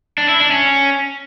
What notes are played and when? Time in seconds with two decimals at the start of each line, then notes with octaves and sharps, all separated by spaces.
0.18 D4
0.29 E4
0.40 D4
0.51 C#4